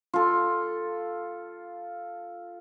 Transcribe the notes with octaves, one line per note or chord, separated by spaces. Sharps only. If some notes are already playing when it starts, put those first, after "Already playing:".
F4 A4